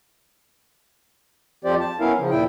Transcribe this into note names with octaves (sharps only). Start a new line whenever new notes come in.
F2 F3 C4 G4 C5 D5
A5
F#3 B3 C#4 E4 A#4 F5
C#3 F3
D#2 A#2 E4 G5